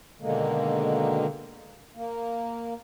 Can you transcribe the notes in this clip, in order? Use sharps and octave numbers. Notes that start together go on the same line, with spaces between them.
B2 D3 D#3 G#3 A#3
A#3